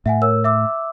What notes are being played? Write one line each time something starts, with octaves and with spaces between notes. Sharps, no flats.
A2 E5 F#5 G#5
A#4 C#5 E6
E5 D6 E6